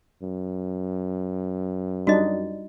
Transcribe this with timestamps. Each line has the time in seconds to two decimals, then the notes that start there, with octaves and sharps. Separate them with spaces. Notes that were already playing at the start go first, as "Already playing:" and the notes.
0.22 F#2
2.07 G3 D4 D#4 F#4 D#5